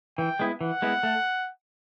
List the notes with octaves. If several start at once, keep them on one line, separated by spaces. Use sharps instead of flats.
E3 G5
G#3 B3 E4
E3 F#5
G#3 B3 E4
A3